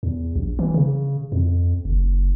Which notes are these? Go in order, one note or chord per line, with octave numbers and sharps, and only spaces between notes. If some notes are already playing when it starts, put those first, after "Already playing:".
E2
A#1
E3
C#3
F2
F#1